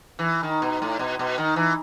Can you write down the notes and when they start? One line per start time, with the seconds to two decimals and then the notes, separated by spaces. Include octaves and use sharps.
0.19 E3
0.43 D#3
0.62 B2
0.82 A2
0.99 B2
1.19 B2
1.38 D#3
1.56 E3